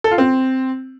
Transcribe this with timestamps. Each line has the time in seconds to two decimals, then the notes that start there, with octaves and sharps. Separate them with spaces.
0.04 A4
0.11 F4
0.18 C4